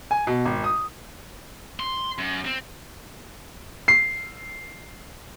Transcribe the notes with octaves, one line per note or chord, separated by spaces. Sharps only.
G#5
B2
G#1
D#6
C6
F#2
C4
C7